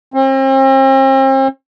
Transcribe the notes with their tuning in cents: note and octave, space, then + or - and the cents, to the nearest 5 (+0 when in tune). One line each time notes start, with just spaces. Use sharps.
C4 +40